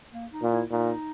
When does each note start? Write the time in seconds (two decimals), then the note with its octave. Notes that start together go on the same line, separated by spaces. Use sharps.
0.13 A#3
0.32 D#4
0.42 A#2
0.51 E4
0.71 A#2 D#4